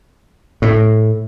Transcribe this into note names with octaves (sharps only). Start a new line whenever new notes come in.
A2